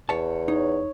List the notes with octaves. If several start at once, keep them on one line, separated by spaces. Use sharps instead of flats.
E2 C#5 A5
D#4 C#5